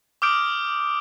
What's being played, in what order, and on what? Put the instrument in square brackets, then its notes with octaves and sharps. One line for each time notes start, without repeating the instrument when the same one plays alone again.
[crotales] D6 D#6 F6 G6 D7